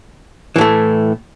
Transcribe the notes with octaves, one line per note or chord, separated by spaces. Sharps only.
A2 E3 A3